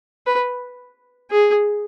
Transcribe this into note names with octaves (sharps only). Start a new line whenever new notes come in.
B4
G#4